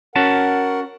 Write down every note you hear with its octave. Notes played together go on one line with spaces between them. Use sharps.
C#4 F#4 A#4 F#5 A5